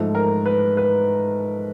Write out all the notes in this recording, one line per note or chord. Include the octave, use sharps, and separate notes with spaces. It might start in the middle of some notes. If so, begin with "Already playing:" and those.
Already playing: G#2 F3 A3
A#4
B4
B4